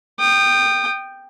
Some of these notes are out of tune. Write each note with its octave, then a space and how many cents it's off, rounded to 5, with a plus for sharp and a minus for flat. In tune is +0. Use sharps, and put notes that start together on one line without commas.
G5 +0 D#6 -30